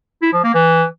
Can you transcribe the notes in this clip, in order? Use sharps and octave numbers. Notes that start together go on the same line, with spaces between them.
E4
F3
A#3
E3